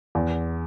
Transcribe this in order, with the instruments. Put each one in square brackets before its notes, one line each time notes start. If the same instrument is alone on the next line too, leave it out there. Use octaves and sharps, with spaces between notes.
[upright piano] E2